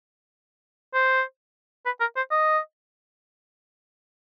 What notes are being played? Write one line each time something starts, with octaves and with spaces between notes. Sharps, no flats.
C5
B4
A#4
C5
D#5